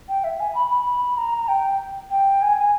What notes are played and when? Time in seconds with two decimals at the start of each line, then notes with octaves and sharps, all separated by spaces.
0.09 G5
0.24 E5
0.40 G#5
0.55 B5
0.71 B5
0.86 B5
1.17 A#5
1.48 G5
2.11 G5
2.42 G#5